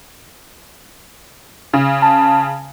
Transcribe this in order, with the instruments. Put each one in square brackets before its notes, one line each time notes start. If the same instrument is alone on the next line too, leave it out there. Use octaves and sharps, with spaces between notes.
[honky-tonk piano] C#3
[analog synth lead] A5